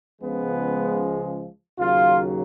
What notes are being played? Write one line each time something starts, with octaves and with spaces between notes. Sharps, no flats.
C#2 C#3 F3 G#3 B3
D#2 C#3 F#3 F4